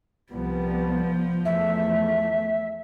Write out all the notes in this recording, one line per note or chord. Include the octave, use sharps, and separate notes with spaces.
C2 F3 G3 B3
E2 A3 E5